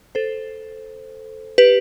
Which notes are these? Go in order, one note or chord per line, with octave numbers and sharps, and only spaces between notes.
A4 C5
G4 B4